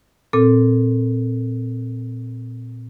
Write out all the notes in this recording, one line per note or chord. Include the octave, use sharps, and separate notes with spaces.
A#2 C4 A4